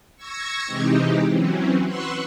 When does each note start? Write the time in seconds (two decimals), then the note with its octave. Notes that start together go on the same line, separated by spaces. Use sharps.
0.17 C#6 E6 G#6 A#6 C#7
0.65 C3 E3 G#3 C4 D#4 G4
1.29 E3 F#3 C4 C#4
1.85 B4 F#5 C6 C#6 E6 F#6